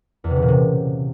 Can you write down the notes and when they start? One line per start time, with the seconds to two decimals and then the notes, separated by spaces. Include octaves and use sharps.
0.24 E2
0.30 C3
0.36 C#3
0.42 A#2
0.48 C3